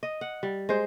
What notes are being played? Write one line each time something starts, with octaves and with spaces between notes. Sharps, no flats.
D#5
F#5
G3
G#3 C5